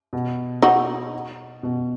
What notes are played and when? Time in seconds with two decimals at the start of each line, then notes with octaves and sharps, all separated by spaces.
0.13 B2
0.62 D#4 F#4
1.63 B2